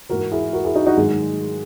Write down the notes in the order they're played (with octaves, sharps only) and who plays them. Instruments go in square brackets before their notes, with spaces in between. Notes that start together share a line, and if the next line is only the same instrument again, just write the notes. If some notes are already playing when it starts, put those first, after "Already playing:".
[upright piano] G#2 E3 F#4 A#4
E4 G#4
F#4 A#4
E4 G#4
D#4 F#4
D#4 F#4
G#2 D#3 F#3 G#3